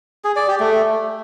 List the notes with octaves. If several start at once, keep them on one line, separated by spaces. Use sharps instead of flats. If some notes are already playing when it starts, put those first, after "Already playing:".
G#4
D5
G4
A3